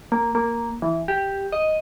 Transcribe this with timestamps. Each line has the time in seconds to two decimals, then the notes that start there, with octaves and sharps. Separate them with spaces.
0.12 A#3
0.35 A#3
0.82 E3
1.08 G4
1.52 D#5